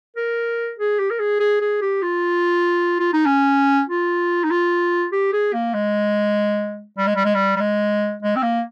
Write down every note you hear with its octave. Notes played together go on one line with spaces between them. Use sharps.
A#4
G#4
G4
A#4
G#4
G#4
G#4
G4
F4
F4
D#4
C#4
F4
D#4
F4
G4
G#4
A#3
G#3
G3
G#3
G3
G#3
G3
G3
G#3
G#3
C4
A#3